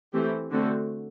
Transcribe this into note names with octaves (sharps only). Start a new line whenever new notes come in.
E3 A3 C4 G4
D3 A3 C4 F#4